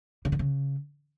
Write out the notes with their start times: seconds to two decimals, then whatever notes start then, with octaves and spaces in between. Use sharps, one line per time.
0.25 C#3
0.32 D3
0.39 C#3